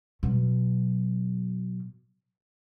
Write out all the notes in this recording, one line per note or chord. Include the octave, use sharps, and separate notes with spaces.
B2 F#3